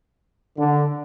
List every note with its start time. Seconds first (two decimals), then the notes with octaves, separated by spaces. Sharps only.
0.59 D3